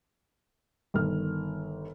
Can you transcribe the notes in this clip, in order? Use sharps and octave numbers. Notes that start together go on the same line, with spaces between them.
G1 D#3 F6